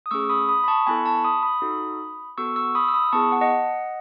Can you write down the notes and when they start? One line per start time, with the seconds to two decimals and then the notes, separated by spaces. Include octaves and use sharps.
0.06 D#6
0.11 A3 C#4 G#4 C#6 E6
0.30 B5 D#6
0.49 B5 D#6
0.64 B5
0.68 A5 C#6
0.87 B3 E4 A4 G#5 B5
1.05 A5 C#6
1.24 B5 D#6
1.43 B5 D#6
1.62 D#4 F#4 A4
2.38 B3 F#4 A4 C#6 E6
2.56 C#6 E6
2.75 B5 D#6
2.88 E6
2.94 B5 D#6
3.12 B3 E4 G#4 A5 C#6
3.31 F#5 A5
3.41 D#5 F#5